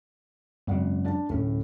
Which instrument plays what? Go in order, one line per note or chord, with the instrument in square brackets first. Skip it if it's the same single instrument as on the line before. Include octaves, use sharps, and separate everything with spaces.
[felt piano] G#1 F#5 [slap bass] F#2 C#3
[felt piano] D4 A5
[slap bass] D1 C#4 [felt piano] A2